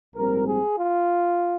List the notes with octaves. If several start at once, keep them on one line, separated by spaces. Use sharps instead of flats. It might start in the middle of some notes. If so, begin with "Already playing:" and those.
A#1 G#2 G3 C4 A#4
G#4
F4